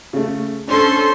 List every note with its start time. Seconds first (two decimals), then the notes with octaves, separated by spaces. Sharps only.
0.13 C#3 A3
0.68 C#4 D4 A4 C5 C6